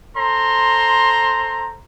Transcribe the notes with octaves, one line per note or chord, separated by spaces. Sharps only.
A4 C5 A#5 C6